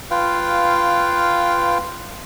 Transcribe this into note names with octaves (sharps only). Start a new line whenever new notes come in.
F4 B4 F5 G5